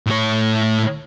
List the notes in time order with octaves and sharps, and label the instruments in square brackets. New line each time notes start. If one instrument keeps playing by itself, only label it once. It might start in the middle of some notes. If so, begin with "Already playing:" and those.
[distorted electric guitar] A2 C#5